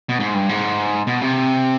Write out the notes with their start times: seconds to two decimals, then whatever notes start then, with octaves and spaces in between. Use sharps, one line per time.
0.09 B2
0.20 G#2
0.34 G2
0.49 G#2
1.07 B2
1.21 C3